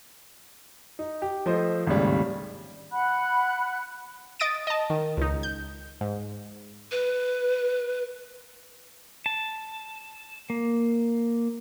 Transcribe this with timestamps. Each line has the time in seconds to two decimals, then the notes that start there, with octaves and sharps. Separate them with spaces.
0.99 D#4
1.22 G4
1.46 F3 A3 C5 D#5
1.87 G#1 D#2 A2 C#3 G3
2.92 F#5 B5 F#6
4.40 D#5 D#6 A6 D7 D#7
4.67 D#5 A5
4.90 D#3
5.17 C#2 D#4
5.43 G6
6.01 G#2
6.92 B4
9.26 A5
10.50 A#3